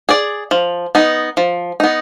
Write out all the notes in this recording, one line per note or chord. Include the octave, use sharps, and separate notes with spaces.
G#4 D5
F3
B3 D#4
F3
B3 D#4